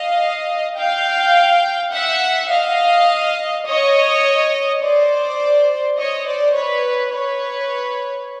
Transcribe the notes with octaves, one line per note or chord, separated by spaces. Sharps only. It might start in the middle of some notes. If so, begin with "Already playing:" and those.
Already playing: D#5 F5
F5 G5
E5 F#5
D#5 F5
C#5 D#5
C5 D5
C#5 D#5
C5 D5
B4 C#5
B4 C#5